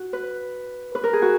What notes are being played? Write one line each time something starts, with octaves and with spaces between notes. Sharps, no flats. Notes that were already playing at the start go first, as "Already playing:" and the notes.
Already playing: F#4
B4
B4
A#4
G#4
F#4